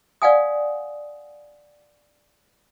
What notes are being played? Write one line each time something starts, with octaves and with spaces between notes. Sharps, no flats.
D5 F5 F#5 G#5 D#6